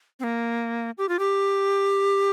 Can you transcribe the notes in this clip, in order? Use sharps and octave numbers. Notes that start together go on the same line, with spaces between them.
C4
A#3
G4
F4
G4